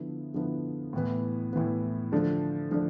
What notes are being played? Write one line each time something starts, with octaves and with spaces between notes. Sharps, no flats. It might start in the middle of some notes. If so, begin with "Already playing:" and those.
Already playing: D3 F3 B3 E4
D3 F3 B3 E4
A2 E3 B3
A2 E3 B3
D3 F3 A3 D4
D3 F3 A3 D4